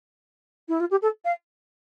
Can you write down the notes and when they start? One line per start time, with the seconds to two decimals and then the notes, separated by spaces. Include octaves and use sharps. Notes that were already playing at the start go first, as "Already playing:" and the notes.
0.68 E4
0.80 F4
0.91 G4
1.02 A4
1.25 F5